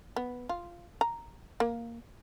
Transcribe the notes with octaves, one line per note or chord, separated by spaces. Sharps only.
B3
F4
A#5
A#3